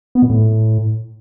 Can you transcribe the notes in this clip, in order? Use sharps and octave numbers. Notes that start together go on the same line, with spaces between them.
B3
A#2
A2